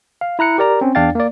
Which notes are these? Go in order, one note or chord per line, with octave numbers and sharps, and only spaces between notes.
F5
E4 A#5 F#6 C#7
G4 A#4 D5 A#5
C4 C#4
E2 D4 D5 F5 G5 A6
A#3 D5